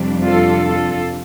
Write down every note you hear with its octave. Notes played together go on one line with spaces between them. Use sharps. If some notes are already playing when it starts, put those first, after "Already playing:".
Already playing: F2 C3 G3 D4
F4 A4
F4 A4